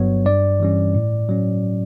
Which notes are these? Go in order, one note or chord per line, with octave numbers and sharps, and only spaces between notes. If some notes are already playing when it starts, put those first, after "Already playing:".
Already playing: G1 G2 F#3 B3 C#5
G2 D5
E3 G3 C#4
A2
F#3 C#4